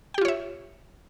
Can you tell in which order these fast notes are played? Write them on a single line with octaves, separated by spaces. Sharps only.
G5 G4 F4 C#5 E5